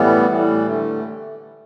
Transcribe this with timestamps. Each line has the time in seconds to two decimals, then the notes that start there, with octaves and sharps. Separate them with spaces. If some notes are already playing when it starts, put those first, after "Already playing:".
Already playing: A2 E3 G3 B3
0.30 A2 E3 G3
0.66 D3 A3